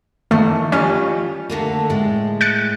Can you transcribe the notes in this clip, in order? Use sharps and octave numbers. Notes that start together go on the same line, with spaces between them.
D#3 E3 A3
G3 C#4 F4 D#5
D3 A3 A#3
A2 G#3
F#6 A6 C#7